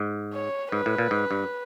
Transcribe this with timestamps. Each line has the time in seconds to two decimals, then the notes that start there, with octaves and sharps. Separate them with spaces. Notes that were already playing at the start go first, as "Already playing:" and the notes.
Already playing: G#2
0.33 C#5
0.72 G#2 B4
0.86 A2
0.98 A#2
1.11 G#2
1.31 G2